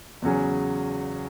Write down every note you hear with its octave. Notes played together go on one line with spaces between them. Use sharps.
E2 C#3 F#3 C#4 G#4